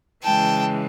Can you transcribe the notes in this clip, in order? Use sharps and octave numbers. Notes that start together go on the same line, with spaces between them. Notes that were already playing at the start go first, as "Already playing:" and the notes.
C#3 E3 G#3 G5 A5